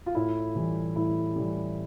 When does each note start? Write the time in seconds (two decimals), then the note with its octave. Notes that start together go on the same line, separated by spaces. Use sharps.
0.06 F4
0.15 A2 E4
0.56 E3 G3
0.95 A2 E4
1.35 E3 G3